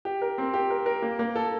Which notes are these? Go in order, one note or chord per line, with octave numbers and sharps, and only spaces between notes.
G4
A#4
C4
G4
A#4
A#4
A#3
A#3
A4